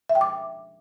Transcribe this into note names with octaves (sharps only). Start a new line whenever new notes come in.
E5
G5
D6